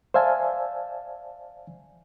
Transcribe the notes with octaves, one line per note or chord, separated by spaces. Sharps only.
C5 D5 E5 F5 G#5 A5